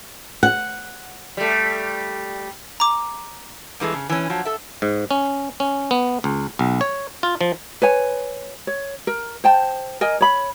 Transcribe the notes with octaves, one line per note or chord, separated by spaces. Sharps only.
F#5
G3 A3
A#5 D6
G2 E3 G#3 A3
C#3
E3 C#4
F3 F#3
A4 E5
G#2
C#4
C#4
B3
C#2
B1
C#5
F4
F3
B4 C#5 G#5
C#5
A#4
C5 G5 A5
A#4 D#5 G#5
C#5 B5